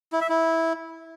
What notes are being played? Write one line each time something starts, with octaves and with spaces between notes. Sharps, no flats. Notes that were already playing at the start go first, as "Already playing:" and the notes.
E4
E5
E4